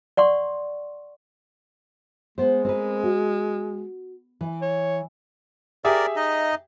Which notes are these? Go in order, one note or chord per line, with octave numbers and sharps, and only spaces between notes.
D5 F#5 C6 C#6
G#3 B3 C5
C4 A#4 B4
F#4
E3
C#5
G4 G#4 A#4 D5 E5
D#4 D#5